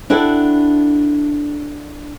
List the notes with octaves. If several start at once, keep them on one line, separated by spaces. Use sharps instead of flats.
D4 E4 F#4 G4 A4